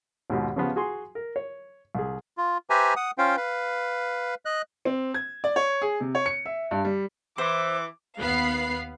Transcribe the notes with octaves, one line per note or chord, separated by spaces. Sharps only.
D#2 G#2 B2 F4 G4
C#3 F3 B3 G4
F#4 G#4 G#5 C6
A#4
C#5
C2 G#4
F4
G4 B4 C5 E5 G#5 A#5
F#5 D#6
C#4 F4 C5 F5 G5
B4 F5
D#5 F#6
C4
G#6
D5
C#5
G#4
C3
C#5
C#7
E5
G2
G3
E3 C5 D6
D#2 B3 F5 B5 C7